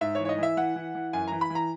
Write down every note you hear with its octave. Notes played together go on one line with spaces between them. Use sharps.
G#2 E5
C#5
E3
C#5
D#5
E3 E5
E3 F#5
E3
E3
F#2 G#5
E3 A#5
B5
E3
A#5